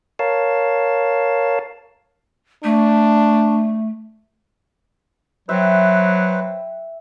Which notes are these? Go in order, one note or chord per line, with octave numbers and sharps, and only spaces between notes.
A#4 C#5 F5 A5
A3 D4
F#3 B4 C5 E5 G5